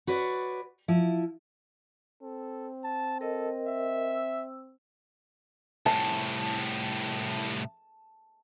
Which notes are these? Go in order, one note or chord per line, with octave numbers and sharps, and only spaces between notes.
F#4 B4 C#5 D5
F3 E4
C4 A4
A5
A4 A#4 D#5
E5
E6
C2 A2 A5